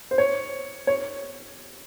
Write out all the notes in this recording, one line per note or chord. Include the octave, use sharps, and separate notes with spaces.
C5
C#5
C#5